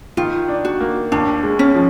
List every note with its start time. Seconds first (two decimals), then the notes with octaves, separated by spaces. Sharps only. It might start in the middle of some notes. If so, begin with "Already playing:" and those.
0.17 D#3 F4
0.48 D4
0.65 F#4
0.80 A#3
1.12 D#2 D4
1.43 G#3
1.59 C#4
1.75 F3